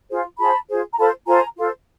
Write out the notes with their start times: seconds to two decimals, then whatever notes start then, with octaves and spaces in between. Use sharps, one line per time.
0.09 F4 G#4 C5
0.39 F4 G#4 C5 A5 B5
0.68 F4 G#4 C5
0.92 A#5
0.98 F4 A4 C5 A5 B5
1.27 F4 A4 C5 G#5 A#5
1.57 F4 A4 C5